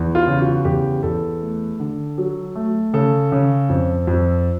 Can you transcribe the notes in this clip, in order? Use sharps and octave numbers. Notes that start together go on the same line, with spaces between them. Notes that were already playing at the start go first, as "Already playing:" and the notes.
Already playing: E2
F4
C#3
F#4
E2 G4
E2 A4
A3
D3
F#3
A3
C#3 A4
C#3
F2
F2